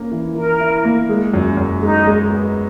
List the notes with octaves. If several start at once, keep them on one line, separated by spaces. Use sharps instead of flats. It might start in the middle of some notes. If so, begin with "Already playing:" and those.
Already playing: A#3 C#4
E3
E3 A#4
E4
A#3
G#3
F#2
F#2
G#3 D#4
G#3
B3